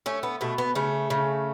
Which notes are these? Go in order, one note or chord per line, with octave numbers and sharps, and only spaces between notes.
A3 C#4
B3
B2 A3
B3
C#3 A3
C#3